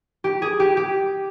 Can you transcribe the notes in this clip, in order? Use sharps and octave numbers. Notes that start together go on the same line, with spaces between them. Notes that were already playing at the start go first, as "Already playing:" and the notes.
G4
G#4
G4
G4